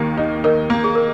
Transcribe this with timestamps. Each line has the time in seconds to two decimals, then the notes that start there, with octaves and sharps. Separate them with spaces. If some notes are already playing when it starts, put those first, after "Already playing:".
Already playing: D#2 D#3 A#3
0.17 D#4
0.44 D#4 A#4
0.70 A#3
0.84 G#4
0.95 A#4